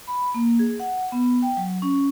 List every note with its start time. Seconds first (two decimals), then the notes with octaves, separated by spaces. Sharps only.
0.07 B5
0.34 A#3
0.59 G#4
0.80 F#5
1.12 B3
1.42 G5
1.57 F#3
1.82 C#4